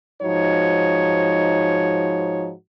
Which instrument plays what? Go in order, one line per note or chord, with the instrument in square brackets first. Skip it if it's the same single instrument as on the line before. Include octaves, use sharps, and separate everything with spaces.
[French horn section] G#2 F3 D#4 F#4 C#5